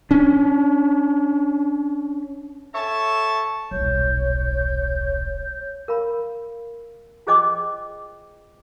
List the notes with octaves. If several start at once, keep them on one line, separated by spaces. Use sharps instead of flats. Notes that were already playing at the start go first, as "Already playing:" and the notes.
C#4 D4
A4 C#5 E5 A5
D#1 B1 C#5 G6
A#4 F5 B5
F4 G#4 C5 D#5 G5 D6